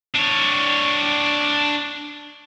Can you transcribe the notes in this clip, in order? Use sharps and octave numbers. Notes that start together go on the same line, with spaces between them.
D4 C#5